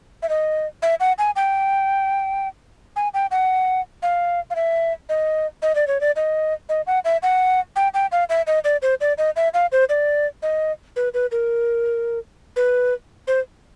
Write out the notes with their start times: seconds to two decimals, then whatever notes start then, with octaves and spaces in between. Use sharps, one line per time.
0.23 E5
0.29 D#5
0.82 E5
1.00 F#5
1.18 G#5
1.36 G5
2.96 G#5
3.14 G5
3.31 F#5
4.03 F5
4.50 F5
4.56 E5
5.09 D#5
5.62 D#5
5.75 D5
5.87 C#5
6.01 D5
6.16 D#5
6.69 D#5
6.87 F#5
7.05 E5
7.23 F#5
7.76 G5
7.94 G5
8.12 F5
8.29 E5
8.47 D#5
8.65 D5
8.82 C5
9.01 D5
9.18 D#5
9.36 E5
9.54 F5
9.72 C5
9.89 D5
10.43 D#5
10.96 B4
11.14 B4
11.31 A#4
12.56 B4
13.27 C5